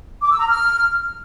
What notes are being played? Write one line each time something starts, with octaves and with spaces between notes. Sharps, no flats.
D6
E6
A#5
F6